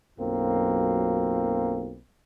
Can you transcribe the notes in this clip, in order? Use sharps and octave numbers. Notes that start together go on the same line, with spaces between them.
B1 F#2 A#3 C4 F4